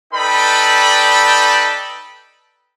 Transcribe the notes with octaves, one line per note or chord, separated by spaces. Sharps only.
D#4 A4 B4 D5 G5 B5